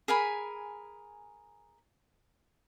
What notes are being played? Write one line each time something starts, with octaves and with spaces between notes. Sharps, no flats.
G#4 A#4 G#5 B5